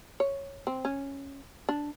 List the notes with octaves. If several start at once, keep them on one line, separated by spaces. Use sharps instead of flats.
C#5
C4
C#4
D4